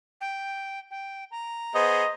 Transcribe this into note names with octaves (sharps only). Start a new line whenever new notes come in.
G5
G5
A#5
B3 G#4 C5 D#5